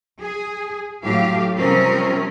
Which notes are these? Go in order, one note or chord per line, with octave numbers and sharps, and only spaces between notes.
G#4
A2 F#3 G4 F5
C3 F3 G3 C4 C#4 A#4